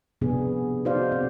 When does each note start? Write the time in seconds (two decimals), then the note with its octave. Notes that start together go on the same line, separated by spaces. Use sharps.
0.21 C3 F3 B3 D4 G#4
0.85 D#4 F#4 C5 D5 F5
1.12 C4